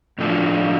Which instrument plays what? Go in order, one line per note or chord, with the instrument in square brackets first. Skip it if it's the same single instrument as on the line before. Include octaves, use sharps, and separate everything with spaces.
[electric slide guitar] A2 F3 A3 D4 F4